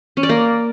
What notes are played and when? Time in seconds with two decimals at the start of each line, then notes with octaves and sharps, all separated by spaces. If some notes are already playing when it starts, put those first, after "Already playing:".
0.17 C#4
0.23 D5
0.29 A#3